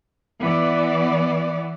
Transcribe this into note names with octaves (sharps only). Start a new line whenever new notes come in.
E3 B3 D5